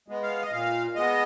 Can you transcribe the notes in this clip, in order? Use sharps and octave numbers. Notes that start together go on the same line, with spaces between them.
G#3 B3
F5
D#5
A#2 F5
G#3 B3 D#5